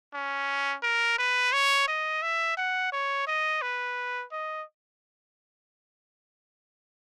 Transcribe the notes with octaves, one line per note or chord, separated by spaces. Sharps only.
C#4
A#4
B4
C#5
D#5
E5
F#5
C#5
D#5
B4
D#5